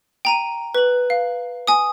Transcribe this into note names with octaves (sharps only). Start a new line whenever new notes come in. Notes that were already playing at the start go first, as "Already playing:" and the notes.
G5 A#5 D#7
B4 F#7
F5
G#5 D#6